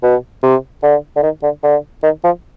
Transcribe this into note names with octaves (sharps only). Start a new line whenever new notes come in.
B2
C3
D3
D3
D#3
D3
D3
D#3
F3